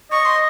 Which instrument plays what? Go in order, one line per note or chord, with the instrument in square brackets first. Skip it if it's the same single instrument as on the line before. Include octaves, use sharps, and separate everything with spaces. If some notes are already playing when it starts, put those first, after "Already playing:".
[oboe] D#5 [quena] C#6
[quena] C6